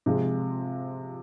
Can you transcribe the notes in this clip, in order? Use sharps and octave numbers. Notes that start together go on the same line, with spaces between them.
C3 F3 G#3